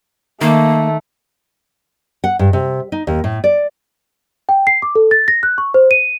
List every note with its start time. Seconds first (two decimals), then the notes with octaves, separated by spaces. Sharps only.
0.41 D#3 A3 A#3
2.24 F#5
2.39 G2
2.53 C3
2.92 D#4
3.07 D#2
3.24 A2
3.44 D5
4.49 G5
4.67 C7
4.82 D6
4.95 A4
5.11 A6
5.28 A#6
5.43 F#6
5.58 C#6
5.74 C5
5.91 D#7